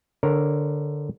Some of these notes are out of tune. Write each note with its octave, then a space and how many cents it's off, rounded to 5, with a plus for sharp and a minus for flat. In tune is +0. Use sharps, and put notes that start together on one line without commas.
D3 +0 A#4 +0 C#5 -20